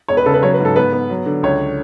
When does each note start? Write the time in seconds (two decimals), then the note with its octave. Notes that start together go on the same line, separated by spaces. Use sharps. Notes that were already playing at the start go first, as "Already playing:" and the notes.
0.08 E1 C#5
0.17 B4
0.26 C#3 A4
0.34 B4
0.42 F#3 C#5
0.54 B4
0.60 G#2
0.65 A4
0.76 B3 B4
0.93 B3
1.10 F#3
1.26 D3
1.43 C#2 C#5